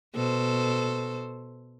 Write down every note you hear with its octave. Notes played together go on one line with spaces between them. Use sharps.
B2 A4 C5